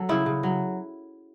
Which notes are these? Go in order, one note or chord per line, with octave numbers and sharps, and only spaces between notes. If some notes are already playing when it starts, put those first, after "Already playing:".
Already playing: F#3 A4
C#3 E4
C#3
F#3